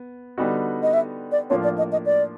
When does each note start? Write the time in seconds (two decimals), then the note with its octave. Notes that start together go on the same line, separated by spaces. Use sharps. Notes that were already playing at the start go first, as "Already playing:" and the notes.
Already playing: B3
0.38 D3 G3 B3 D#4 F#4
0.83 D#5
0.93 E5
1.32 D5
1.50 A2 F3 A#3 D4 F4 C#5
1.64 D5
1.78 D#5
1.92 D#5
2.06 D5